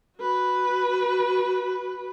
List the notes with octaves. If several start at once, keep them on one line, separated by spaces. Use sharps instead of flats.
F#4 B4